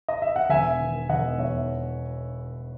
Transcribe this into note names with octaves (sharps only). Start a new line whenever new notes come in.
D#5
E5
F#5
E1 E5 G#5
D#3
E1 D#5 F#5
E2 C#5 E5